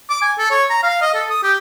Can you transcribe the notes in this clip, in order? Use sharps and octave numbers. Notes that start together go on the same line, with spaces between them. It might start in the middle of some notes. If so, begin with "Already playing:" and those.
D6
G#5
A4
C#5
A#5
F5
D#5
A4
D#6
G4